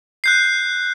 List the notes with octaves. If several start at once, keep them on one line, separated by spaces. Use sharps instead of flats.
F#6 G6 C7